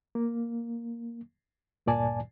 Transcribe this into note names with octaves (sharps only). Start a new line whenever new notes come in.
A#3
D2 G2 A#2 D5 G#5 A5